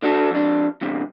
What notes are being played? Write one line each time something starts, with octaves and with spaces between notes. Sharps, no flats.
D3 D4 F#4 A4
F2 D4
E2 G2 C3